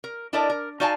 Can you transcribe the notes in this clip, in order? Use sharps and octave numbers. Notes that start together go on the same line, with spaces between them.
A#4
D4 E4 A4 A#4 D5 D#5
A#4
D#4 F#4 D5 F5 G#5 A5